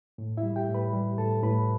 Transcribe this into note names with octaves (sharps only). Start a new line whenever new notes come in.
A2
E4 E5
G3
G4 G5
A2
B4 B5
G3
A2 A4 A5
A2 B4 B5